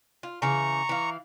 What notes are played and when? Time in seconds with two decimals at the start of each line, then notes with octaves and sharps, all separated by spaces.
0.23 F4
0.42 C#3 E3 A#5 C#6
0.89 E3 F5